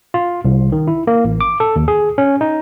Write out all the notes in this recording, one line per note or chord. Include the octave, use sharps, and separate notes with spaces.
F4
C2
D#3
E4
A#3
A1
D6
A4
D#2
G#4
C#4
D#4